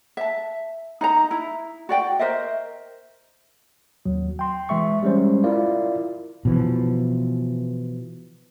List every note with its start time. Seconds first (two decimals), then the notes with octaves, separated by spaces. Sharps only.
0.17 E5 A5
1.01 D#4 D#5 A#5
1.31 E4
1.89 F#4 D5 G5
2.19 A#4 C5 D#5 E5
4.06 D#2 F#3
4.39 G5 C6
4.69 E3 G#3 E5 C#6
5.03 G3 G#3 C#4 C5
5.44 E4 F4 A#4 D5 F5
6.45 B2 E3 F3